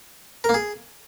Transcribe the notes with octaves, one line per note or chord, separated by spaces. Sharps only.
A#4
A#3
G#4